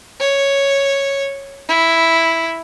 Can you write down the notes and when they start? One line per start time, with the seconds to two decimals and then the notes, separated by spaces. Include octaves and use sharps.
0.20 C#5
1.69 E4